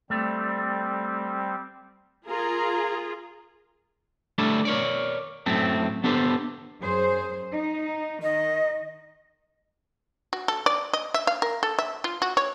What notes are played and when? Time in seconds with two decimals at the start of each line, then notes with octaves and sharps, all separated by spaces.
0.10 G3 A3 C4
2.27 F4 G#4 A#4 A#5
4.38 G3 A3 D4 E4
4.65 A#4 C#5 D5
5.46 F#2 A2 A3 C4
6.04 B3 D4 G4 A4 C5
6.81 F#2 G#4 C5
7.52 D#4
8.22 D#3 D#5
10.33 F#4
10.48 A4
10.66 D5
10.93 D#5
11.14 E5
11.27 F5
11.42 A#4
11.63 A4
11.79 E5
12.04 F4
12.22 F#4
12.37 C#5